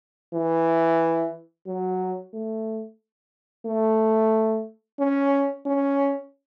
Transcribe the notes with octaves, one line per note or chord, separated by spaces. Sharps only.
E3
F#3
A3
A3
C#4
C#4